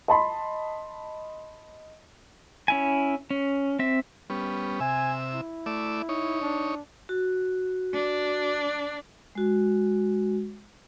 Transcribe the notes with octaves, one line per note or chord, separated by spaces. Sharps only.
D#5 A5 B5 C6
C#4 E4 G#5
C#4
C4 E5
G3 B3 C#4
C3 E5 G#5
E4
A3 D5 E5
D#4 C#5
D4
F#4
D4
G#3 F#4